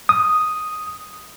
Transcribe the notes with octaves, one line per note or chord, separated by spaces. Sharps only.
D#6